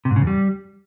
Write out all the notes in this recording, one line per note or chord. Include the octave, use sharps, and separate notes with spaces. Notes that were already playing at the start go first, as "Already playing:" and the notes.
C3
G#2
C#3
E2
G3